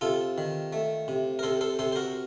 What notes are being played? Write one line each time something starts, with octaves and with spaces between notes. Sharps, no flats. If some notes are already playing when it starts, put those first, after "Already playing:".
C3 F4 A4
D#3
A3
C3
A#4
C3 A4 C5
A4 C5
C3 A4 C5
C5
F#4 A#4